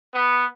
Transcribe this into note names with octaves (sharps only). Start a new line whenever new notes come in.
B3